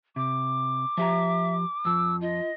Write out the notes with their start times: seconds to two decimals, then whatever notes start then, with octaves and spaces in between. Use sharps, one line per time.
0.16 C3 D6
0.97 F3 G4 E5 A#5
1.85 F2 F3 E6
2.21 F4 D#5